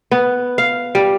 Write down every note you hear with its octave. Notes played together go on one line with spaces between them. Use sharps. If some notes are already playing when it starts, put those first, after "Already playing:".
B3
F5
G3